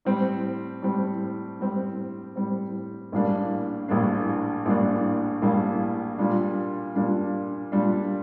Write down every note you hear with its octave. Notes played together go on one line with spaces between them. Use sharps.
A2 G3 C4
A2 G3 C4
A2 G3 C4
A2 G3 C4
A#1 A2 G3 A#3 D4
A#1 A2 G3 A#3 D4
A#1 A2 G3 A#3 D4
A#1 A2 G3 A#3 D4
A#2 G3 D4
A#2 G3 D4
A#2 G3 D4